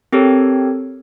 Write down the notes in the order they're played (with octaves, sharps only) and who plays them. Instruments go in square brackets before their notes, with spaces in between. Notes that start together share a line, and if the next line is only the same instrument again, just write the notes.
[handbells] C4 G4 A4 A#4 C#5